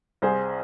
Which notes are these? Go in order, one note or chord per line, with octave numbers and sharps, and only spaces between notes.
C2 G#4 C5